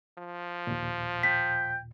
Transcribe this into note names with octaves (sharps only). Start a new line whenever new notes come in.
F3
D#2 A#2
G5 B6